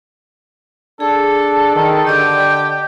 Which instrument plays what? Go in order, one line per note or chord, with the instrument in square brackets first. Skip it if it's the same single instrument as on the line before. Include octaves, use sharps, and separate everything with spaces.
[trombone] D4 [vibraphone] G#4 [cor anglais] A4
[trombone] D#3
[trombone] D3 [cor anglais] G4 [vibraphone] D5 D#5 [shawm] G5